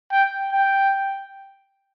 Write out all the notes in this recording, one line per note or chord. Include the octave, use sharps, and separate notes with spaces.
G5
G5